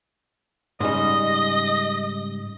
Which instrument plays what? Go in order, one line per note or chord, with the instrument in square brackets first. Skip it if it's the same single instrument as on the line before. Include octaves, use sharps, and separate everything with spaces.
[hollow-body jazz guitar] G#2 C#3 G3 [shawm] D#5